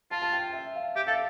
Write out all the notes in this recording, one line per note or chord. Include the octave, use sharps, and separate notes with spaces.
F4 A5
A5
G5
E5
F5
G4 E5
A4 F5